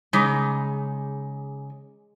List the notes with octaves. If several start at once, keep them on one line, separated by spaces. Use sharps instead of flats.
C#3 G#3 D#4 D6